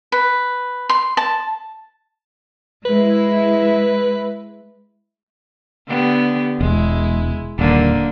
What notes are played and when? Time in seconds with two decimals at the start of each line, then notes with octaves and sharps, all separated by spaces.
0.12 B4
0.89 C6
1.17 A5
2.85 G#3 E4 B4
5.88 D3 B3 G4
6.61 E1 G#3 E4
7.59 D#1 D3 A#3